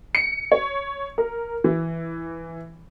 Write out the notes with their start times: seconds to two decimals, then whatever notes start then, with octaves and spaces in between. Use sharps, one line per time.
0.15 C#7
0.52 C#5
1.18 A#4
1.64 E3